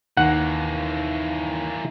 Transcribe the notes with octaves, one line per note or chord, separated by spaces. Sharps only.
D#2 E3 A#3 F#5